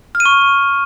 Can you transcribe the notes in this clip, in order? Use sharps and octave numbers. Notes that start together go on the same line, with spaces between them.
F6
D#7
C#6